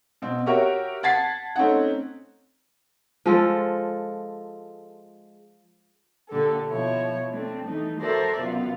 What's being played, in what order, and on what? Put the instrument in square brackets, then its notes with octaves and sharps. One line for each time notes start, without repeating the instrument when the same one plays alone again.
[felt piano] B2 C4
F#4 G4 A#4 C#5 E5
F#5 A5 G#6 A6 B6 C7
A3 C4 C#4 D#4 F#5
[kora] F3 G#3 F4 A4
[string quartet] A#2 D3 G4 A4
B2 F3 E4 C#5
A3 C4 D4
E3 A3 D#4
F#4 A4 A#4 C5 D5 E5
F#2 C3 B3 F4